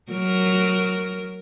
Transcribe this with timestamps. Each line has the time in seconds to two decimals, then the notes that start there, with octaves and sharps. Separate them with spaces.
0.12 F#3 A#4